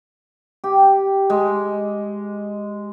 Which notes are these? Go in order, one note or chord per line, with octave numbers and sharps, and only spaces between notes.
G4
G#3